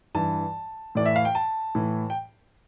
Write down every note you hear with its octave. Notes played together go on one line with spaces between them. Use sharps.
G2 E3 A5
A2 E3 D5
E5
F5
G5
A5
A2 E3
G5